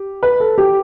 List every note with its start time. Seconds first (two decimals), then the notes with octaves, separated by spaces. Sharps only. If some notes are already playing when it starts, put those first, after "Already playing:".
Already playing: G4
0.23 B4
0.40 A4
0.58 G4